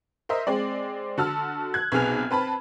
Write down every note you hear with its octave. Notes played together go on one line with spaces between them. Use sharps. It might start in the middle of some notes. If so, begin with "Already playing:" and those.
A#4 C5 D#5 E5
G#3 C4 D5
D3 F#4 A5 E6 F6
F#6 G#6
B1 C3 B3 G#4 F6 F7
C4 B4 A5 B5